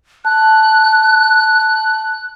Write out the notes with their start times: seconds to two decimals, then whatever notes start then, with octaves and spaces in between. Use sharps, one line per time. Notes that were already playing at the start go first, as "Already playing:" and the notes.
0.25 A5 F#6